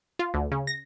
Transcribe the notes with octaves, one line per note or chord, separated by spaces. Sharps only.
F4
D2
C#3
A#6